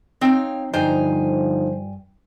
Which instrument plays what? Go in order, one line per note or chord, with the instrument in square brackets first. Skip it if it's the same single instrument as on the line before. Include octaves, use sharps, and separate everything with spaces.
[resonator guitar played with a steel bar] C4 D#4 G5 [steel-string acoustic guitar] C#5 F5
[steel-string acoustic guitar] G2 G#5 A#5 [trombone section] D3 F3 [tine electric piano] D#4 [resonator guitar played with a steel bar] C5